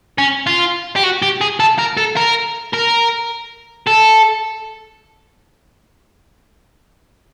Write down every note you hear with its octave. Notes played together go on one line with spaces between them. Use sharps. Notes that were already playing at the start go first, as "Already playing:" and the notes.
C#4
F4
G4
F#4
G4
G#4
A4
A#4
A4
A#4
A#4
A4